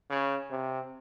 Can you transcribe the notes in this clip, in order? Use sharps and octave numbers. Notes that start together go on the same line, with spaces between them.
C#3
C3